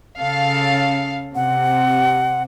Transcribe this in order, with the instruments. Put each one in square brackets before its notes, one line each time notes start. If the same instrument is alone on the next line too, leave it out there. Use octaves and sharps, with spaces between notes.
[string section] C#3 A4 F5
[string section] C3 [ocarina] F#5